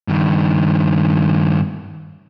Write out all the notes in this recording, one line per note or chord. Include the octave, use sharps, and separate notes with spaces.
G2 D#3